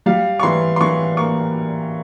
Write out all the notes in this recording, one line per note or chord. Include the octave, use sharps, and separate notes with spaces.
G3 F5
C#6
E3 C6
C6
E3 C#6
A#3 C#6